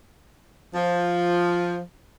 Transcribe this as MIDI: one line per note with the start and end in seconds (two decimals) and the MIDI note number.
0.75 1.79 53